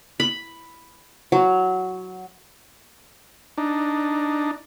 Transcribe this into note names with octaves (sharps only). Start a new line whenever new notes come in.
B5
F#3
D4 D#4